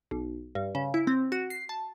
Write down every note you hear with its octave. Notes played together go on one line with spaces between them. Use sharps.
B1
G2
C#3
E4
C4
F#4
C7
A5